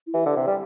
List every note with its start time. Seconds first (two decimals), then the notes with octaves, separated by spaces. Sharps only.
0.07 E4
0.14 E3 G4
0.26 D3
0.37 C3
0.47 G3